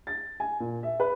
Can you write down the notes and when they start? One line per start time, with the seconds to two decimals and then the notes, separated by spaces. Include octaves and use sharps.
0.07 A6
0.40 G#5
0.60 A#2
0.83 E5
1.00 B4